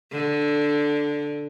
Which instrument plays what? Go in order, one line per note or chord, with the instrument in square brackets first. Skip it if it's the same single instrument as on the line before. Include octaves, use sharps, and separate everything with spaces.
[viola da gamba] D3